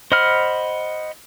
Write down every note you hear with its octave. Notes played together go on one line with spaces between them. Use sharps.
C5 D#5 F#5 B5 F6